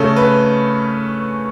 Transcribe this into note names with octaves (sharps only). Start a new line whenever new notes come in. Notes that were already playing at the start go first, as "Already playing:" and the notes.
Already playing: C#3 A3 C#4 A4
B4